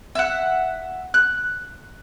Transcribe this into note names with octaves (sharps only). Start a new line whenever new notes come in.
E5 F#5
F#6